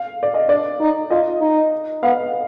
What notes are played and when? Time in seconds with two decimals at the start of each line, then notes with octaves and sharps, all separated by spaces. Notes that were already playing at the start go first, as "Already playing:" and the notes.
Already playing: F5
0.23 D5
0.34 D#5
0.49 D4 D5
0.81 D#4
1.10 F4 D#5
1.41 D#4
2.02 B3 F5